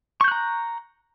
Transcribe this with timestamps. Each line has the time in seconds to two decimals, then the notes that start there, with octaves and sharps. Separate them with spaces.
0.21 C#6
0.24 G6
0.28 F#6
0.32 A#5